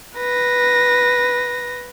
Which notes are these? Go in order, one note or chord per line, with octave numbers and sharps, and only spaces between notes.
B4 A#6